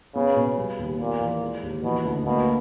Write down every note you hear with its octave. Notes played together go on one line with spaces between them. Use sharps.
C#3 B3
B2
G3
D#2
A#2 B3
E3
G#3
D#2
B2 E3
D2
B2 A#3